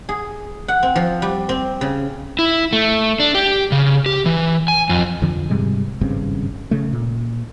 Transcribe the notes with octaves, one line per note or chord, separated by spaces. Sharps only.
G#4
F#5
C4
F3
G3
C4
C#3
E4
A3
D4
G4
C#3
G4
E3
G#5
F2
F2 D3 F3
G#2 C3 G3 G#3
G#1 G2 C#3 C4
C#3 A3
A#2